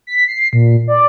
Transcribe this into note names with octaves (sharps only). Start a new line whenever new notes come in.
B6
C7
A#2
D5